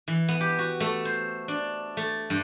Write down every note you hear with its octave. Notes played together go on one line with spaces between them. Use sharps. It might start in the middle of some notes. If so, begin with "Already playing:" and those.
E3
B3
G4
F#4
A3
C5
D4
A3
G2